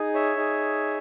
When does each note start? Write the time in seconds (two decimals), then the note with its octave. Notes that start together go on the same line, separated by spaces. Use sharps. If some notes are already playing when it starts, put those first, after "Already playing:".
Already playing: D#4 G#4
0.14 C#5 E5
0.37 D#4 G#4